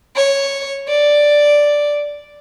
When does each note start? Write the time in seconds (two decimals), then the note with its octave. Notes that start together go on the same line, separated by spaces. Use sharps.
0.16 C#5
0.88 D5